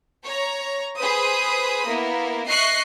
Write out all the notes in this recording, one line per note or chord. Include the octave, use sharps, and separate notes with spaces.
C#5 A#5
G#4 B4 C5 B5 D#6
A#3 B3 E4
D#5 E5 C#6 F#6 C7